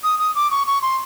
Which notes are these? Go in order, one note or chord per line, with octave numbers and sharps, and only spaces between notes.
D#6
D#6
D6
C#6
C#6
C6